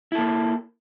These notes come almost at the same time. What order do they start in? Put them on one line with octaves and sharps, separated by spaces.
E4 A4 A#3